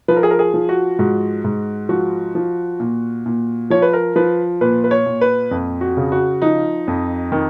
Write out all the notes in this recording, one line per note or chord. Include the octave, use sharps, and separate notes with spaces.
F3 B4
A#4
G#4
A#4
G#4
F3
F#4
G#2 F#4
G#2
F3 F#4
F3
A#2
A#2
F3 C#5
B4
A#4
F3 B4
A#2 B4
B4
C#5
A#2
B4
F2
F#4
C#3
F#4
F3 D#4
F2
D#3